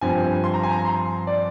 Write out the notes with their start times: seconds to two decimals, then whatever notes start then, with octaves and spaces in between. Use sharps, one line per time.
0.01 G2 F3 C4 G#5
0.44 C6
0.54 A#5
0.63 G#5
0.72 A#5
0.85 C6
1.27 D5